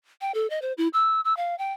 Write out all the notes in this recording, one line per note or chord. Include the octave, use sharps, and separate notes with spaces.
G5
A4
D#5
C5
E4
E6
E6
F5
G5